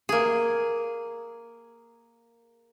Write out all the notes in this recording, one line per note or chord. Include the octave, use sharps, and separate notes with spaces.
A#3 G#4